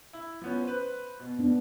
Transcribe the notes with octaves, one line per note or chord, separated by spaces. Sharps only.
E4
F3 B3 C#4
B4 C5
B2
B3 D4